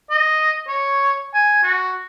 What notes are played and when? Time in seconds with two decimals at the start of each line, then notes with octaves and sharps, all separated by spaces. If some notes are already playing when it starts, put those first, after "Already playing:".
0.10 D#5
0.68 C#5
1.34 G#5
1.63 F#4